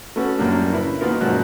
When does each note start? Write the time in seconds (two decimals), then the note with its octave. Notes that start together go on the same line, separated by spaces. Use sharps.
0.16 A3 B3 C#4 F#4
0.38 F#2 A2 G3 A#3 D4
0.72 C#3 E4 B4
1.01 B2 D#3 A#3 B3 F4 A#4
1.21 F#2 A#2 F3 G#3 F#4 F#6